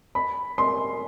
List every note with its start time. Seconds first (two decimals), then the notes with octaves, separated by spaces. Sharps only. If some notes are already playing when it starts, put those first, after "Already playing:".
0.15 B5
0.58 C6